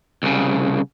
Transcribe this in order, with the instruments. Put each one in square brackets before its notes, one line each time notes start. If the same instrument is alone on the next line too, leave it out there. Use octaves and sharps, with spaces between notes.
[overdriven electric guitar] C2 C#3